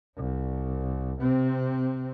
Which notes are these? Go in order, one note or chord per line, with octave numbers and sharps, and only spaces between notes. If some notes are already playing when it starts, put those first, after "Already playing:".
C2
C3 C4